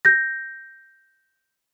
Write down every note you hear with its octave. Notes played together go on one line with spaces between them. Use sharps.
G6 A#6